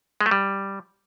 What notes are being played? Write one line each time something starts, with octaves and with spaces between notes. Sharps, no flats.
G#3
A3
G3